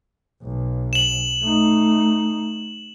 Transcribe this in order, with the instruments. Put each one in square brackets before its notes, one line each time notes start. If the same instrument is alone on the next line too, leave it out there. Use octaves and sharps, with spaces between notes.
[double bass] B1
[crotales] E7 F#7
[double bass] A3 D#4